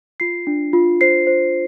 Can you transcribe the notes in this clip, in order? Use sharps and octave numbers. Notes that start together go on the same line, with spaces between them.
F4 C7
D4
F4
C5 C7
C5